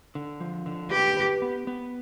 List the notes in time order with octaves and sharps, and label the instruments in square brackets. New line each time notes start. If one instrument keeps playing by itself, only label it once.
[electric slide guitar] D3
F3
D3
[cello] G4 [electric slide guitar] B4
[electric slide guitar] B4
B3
B3